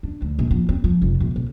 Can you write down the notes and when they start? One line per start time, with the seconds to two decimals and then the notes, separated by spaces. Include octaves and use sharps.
0.03 D4
0.22 D2
0.39 A#1
0.51 F3
0.69 C4
0.84 F3
1.02 F1
1.20 A#1
1.36 B1